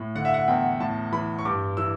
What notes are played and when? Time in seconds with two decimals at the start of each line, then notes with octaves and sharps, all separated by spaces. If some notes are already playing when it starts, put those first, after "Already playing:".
Already playing: A2
0.15 D3 F#5
0.25 E5
0.34 F#5
0.48 E2 G5
0.80 A2 A5
1.12 E3 B5
1.39 C#6
1.45 G2 D6
1.77 E3 E6